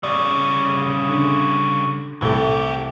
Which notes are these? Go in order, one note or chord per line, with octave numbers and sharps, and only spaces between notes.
C#3 G3 D5
D3
C2 E3 A3 G4 A4